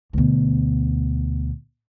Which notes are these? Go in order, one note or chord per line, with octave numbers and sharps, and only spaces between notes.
D2 B2